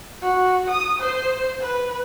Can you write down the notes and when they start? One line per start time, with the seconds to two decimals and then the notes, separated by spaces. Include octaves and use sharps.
0.22 F#4
0.70 D#6
1.00 C5
1.61 B4